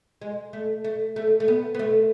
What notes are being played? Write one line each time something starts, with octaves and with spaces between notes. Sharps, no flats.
G#3
A3
A3
A3
A3
B3
B3
A3